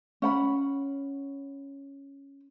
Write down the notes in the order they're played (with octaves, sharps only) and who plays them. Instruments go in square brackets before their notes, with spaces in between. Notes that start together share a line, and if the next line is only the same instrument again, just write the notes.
[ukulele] C#4 F#5 B5